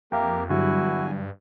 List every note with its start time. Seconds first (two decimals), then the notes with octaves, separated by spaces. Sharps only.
0.12 F2 A#3 G4 A#4 E5 F5 G5
0.50 E2 G2 D3 F#3 G3 E4 F#4 G#5